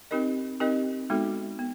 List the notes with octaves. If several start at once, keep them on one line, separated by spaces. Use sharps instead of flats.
C4 D#4 G4 A#4 D#5
C4 D#4 G4 A#4 D#5
G#3 B3 D#4 F#4 A4
B3